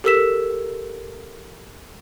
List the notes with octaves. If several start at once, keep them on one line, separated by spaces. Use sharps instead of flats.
G4 A4 A#4 E6 B6 E7